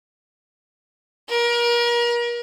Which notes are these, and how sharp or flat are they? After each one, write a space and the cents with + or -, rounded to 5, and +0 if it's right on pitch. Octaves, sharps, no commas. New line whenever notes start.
A#4 +35